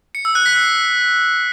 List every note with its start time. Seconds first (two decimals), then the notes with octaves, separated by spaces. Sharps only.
0.15 C#7
0.25 E6
0.35 F#6
0.46 B6
0.56 C7